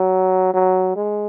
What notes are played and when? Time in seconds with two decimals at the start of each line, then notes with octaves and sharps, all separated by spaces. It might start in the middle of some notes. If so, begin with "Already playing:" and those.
Already playing: F#3
0.54 F#3
0.96 G#3